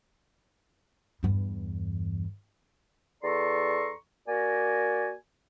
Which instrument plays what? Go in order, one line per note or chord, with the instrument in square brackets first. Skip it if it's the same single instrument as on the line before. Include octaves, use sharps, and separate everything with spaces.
[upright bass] E2 G2
[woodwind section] E2 A4 D5 A#5 C6 C#6
A#3 F#4 A#4 D5 G#5